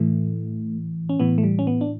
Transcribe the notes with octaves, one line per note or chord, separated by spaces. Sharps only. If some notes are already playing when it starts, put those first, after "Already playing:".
Already playing: A2 E3 A3
C#4
A2 E3 B3
A3
G3
C#4
B3
D4